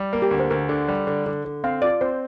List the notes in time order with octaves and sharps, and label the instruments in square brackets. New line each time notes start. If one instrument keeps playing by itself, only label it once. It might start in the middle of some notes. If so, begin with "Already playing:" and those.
Already playing: [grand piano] G3
A#3
[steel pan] G4
[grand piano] D2
[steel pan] C5
[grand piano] D2 [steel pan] A#4
[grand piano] D3
G3
D3
D3
D3
[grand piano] C4 [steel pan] F5
[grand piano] F4 [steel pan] D5
[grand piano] C4 [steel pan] C5